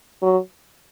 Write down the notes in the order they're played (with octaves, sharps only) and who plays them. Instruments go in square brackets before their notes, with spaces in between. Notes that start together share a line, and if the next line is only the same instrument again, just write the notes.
[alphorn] F#3